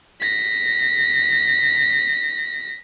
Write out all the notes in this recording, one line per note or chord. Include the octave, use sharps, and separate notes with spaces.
A#6 B6